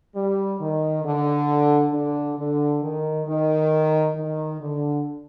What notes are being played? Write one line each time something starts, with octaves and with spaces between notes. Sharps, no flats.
G3
D#3
D3
D3
D3
D#3
D#3
D#3
D3